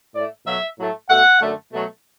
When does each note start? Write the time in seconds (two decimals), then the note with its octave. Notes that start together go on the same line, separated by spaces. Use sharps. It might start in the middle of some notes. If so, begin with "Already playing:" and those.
0.14 A2 A3 D5
0.46 B2 F#3 A3 E5
0.78 A2 F#3 A3
1.09 B2 A3 F#5
1.41 F#2 D3 A3
1.73 B2 F#3 A3